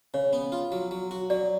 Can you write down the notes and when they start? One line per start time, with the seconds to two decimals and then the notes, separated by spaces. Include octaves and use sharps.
0.14 C#3 C#5
0.33 B3
0.52 F4
0.72 F#3
0.91 F#3
1.11 F#4
1.30 F#3 D5